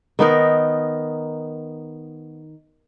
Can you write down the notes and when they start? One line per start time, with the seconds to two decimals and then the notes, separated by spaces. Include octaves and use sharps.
0.19 D#3 B3 D#4 A#4